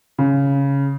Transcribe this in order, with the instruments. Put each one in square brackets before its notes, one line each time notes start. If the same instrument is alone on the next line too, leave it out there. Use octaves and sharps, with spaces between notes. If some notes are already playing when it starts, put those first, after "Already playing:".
[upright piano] C#3